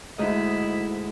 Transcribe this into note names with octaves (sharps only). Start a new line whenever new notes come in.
D2 G#2 E4 D#5